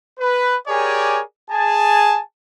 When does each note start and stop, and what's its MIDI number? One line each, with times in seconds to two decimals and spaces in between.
0.19 0.55 71
0.68 1.20 67
0.68 1.20 68
0.68 1.20 70
0.68 1.20 73
0.68 1.20 74
0.68 1.20 80
1.51 2.19 68
1.51 2.19 80
1.51 2.19 81